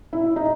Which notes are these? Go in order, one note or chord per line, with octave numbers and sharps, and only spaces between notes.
E4
D#4